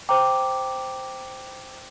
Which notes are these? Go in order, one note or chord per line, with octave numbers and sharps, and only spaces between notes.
C5 G5 A#5 D6